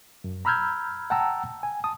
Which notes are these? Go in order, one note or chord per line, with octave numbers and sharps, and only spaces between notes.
F#2
A#5 B5 E6 F6 G6 G#6
F#5 G5 A5 A#5 E6
G#5
A5 D#6